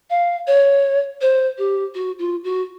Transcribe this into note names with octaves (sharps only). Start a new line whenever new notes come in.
F5
C#5
C5
G4
F#4
F4
F#4